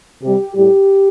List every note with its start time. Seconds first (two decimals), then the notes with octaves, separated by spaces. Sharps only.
0.23 C3 G3 G4
0.56 A2 G3 G4